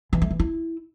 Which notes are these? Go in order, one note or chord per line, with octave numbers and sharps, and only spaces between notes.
E3
A3
E3
E4